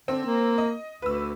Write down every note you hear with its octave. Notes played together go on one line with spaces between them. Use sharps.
D3 C4
A#3
D#5
D2 B4 E6